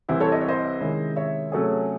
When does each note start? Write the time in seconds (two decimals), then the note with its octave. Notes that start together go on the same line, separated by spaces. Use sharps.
0.09 C2 C3 E3 C4 E4
0.20 A4 C#5
0.32 D#5
0.41 C#5
0.48 C5 D#5
0.81 C3 D#3 G#3 C#4 E4
1.16 C#5 E5
1.52 C3 F#3 A3 C#4 G#4 A4 C#5